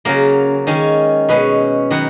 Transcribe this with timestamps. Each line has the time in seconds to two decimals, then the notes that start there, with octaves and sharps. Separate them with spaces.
0.05 C#3 F#3 A#3 A#4
0.67 D#3 G#3 C#4
1.29 B2 G#3 C#4 B4
1.90 D#3 F#3 B3 F#5